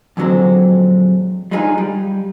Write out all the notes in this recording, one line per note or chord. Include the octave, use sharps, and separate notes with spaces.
F2 A#2 D3 F#3 G#3 C4
G3 G#3 D4 D#4 F4 G#4
G3